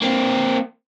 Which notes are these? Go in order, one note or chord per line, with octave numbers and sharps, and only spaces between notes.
A#3 C4